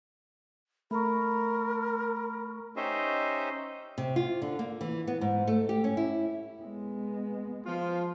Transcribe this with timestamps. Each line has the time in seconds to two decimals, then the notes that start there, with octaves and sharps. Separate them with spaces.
0.91 A3 A#4 B5 C#6
2.76 C#4 D#4 G4 C5 D#5 E5
3.98 C3
4.16 F4
4.42 D3
4.59 A#3
4.81 E3
5.07 B3
5.21 G#2
5.47 A3
5.69 G4
5.84 C#4
5.97 E4
6.62 G#3 B3
7.66 F3 F4